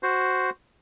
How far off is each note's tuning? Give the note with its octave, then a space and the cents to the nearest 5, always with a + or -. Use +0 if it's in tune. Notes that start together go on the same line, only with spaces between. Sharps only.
F#4 +0 C5 +0